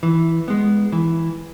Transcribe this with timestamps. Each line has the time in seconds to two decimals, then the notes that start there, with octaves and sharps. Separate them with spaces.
0.03 E3
0.48 G#3 B3
0.92 E3